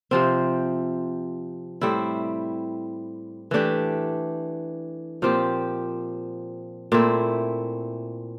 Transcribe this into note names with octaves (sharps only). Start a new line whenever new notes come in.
C3 F3 C4
A2 G3 C4 E4
E3 A3 D4 G4
A#2 F3 C4 G4
A#2 A3 C4 E4